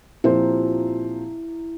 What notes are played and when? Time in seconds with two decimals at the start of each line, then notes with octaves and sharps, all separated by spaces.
0.24 A#2 F3 C4 E4 G4 C5